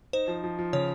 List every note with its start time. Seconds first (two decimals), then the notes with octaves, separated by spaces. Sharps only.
0.13 D#4 C5
0.28 F3
0.44 F3
0.59 F3
0.73 C#3 C#5